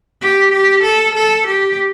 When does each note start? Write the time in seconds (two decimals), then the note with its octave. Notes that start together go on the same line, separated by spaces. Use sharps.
0.21 G4
0.52 G4
0.83 A4
1.15 A4
1.47 G4